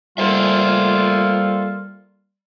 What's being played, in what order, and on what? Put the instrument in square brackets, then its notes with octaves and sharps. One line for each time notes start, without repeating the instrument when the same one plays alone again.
[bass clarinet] G3 [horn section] A#3 F4 [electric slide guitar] A4 C5 E5